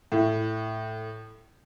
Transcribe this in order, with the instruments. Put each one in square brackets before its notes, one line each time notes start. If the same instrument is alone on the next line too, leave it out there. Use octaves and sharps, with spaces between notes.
[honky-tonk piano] A2